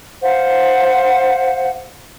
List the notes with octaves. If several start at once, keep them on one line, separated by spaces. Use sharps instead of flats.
C5 F5 F#5